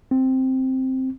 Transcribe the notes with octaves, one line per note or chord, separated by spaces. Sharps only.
C4